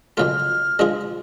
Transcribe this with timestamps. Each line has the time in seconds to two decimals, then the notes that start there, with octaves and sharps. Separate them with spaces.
0.17 F2 C#3 F#3 A3 F4 F6
0.79 F3 G#3 D4 F4 G#4